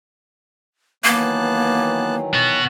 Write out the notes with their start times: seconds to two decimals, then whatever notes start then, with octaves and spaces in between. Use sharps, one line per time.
1.04 D#3 E3 F#3 A#3 B3 A5 F#6
2.34 B3 F#4